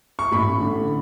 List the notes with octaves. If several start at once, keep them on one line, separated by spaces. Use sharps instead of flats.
C#6
A1 B5
D3